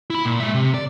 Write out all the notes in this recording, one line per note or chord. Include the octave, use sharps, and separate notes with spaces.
E4 B5
A#2
G#3 E5
C3
D5